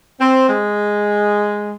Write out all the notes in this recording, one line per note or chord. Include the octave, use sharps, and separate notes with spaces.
C4
G#3